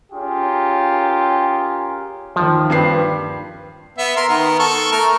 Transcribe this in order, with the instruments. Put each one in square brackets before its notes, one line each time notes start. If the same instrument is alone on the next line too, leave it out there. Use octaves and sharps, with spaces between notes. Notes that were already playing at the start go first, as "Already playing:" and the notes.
[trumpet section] C#4 F4 G4 G#4 A#4
[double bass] D#2 D#3 [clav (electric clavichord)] F3
[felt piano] G2 B4 C7
[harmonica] B3 E5
A#4 C6
D#3 B3 A#4
A4 C#6
A3 A#4